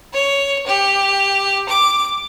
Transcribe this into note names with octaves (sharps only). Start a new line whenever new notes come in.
C#5
G4
D6